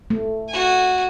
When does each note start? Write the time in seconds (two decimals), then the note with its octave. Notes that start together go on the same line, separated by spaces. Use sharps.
0.10 A3
0.49 F#4 G#5